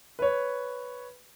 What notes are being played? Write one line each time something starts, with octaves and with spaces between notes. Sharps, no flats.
B4 C#5